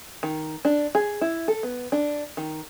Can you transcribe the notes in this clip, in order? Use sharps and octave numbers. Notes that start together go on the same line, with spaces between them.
D#3
D4
G#4
E4
A4
B3
D4
D#3